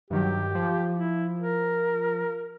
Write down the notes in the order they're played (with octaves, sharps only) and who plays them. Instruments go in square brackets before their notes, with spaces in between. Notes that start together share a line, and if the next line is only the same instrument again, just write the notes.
[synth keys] G2 D#3 F#3 [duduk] G4
[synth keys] F3
[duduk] E4
A#4